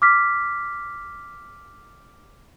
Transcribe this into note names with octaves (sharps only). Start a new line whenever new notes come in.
D6 F6 B6